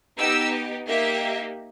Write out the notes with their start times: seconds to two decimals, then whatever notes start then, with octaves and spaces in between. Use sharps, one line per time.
0.17 B3 D#4 G4 E6
0.86 A#3 D#4 G4 E5